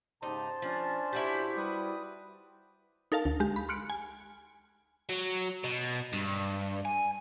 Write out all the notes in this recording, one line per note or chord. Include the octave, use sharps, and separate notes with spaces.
G#2 C#3 D#4 G4 C5 A5
F3 C#4 D4
E4 F#4 G4
G3 B4 D#6
D#4 A4 A#4 F5 A5
D2
G#3 G4
B5
C6 F6 F#6 C#7 D7
G#5
F#3
B2
G2
G#5